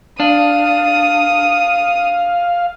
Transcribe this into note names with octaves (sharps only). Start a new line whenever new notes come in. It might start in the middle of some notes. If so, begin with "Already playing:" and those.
D4 F5 D#6